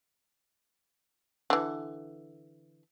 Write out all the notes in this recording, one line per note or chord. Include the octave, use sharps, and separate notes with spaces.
D3 E3